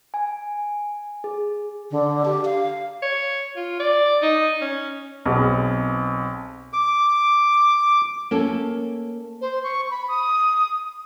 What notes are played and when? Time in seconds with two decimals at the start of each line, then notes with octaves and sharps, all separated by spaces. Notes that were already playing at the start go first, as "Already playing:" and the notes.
0.14 G#5
1.24 G#4
1.91 D3
2.25 G4
2.45 F5
3.02 C#5
3.56 F4
3.80 D5
4.22 D#4
4.61 C#4
5.26 B1 B3 C4 G#4
6.73 D6
8.31 A#3 C#4 A4
9.41 C5
9.64 C#6
9.91 B5
10.08 D#6